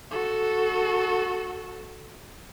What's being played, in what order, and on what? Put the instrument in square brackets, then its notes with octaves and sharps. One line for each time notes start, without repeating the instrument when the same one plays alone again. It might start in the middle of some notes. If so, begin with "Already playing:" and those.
[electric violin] F#4 A4